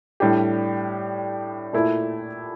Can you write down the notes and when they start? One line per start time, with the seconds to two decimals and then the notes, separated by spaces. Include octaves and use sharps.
0.20 A2 G3 D4 G4
1.73 A#2 A3 E4